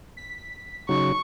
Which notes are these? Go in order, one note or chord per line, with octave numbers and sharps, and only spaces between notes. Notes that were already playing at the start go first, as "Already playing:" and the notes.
B6
C#3 F#3 D#4 C#6